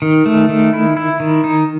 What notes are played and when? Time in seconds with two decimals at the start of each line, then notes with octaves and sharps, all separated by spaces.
0.02 D#3
0.26 A3
0.49 D#3
0.73 E4
0.97 E4
1.20 D#3
1.44 D#4